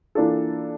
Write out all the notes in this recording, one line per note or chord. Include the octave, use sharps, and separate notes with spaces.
E3 A#3 D4 F4 A4